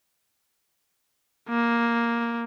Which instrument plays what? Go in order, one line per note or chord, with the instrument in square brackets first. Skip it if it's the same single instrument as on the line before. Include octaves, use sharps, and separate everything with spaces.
[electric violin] A#3